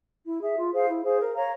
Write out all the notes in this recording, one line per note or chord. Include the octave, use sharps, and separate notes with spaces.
E4
G#4 E5
F4
G#4 C5 F5
E4
G#4 C5 F5
A#4
C#5 F5 A#5